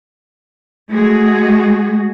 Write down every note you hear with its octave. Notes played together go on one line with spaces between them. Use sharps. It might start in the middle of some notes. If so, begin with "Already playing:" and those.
G#3 A3 F#4 G#4